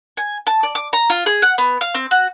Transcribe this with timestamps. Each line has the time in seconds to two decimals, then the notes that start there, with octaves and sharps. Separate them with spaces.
0.17 G#5
0.47 A5
0.63 D5
0.75 D6
0.93 A#5
1.10 F4
1.26 G#4
1.42 F#5
1.58 B3
1.81 F5
1.95 C4
2.11 F#4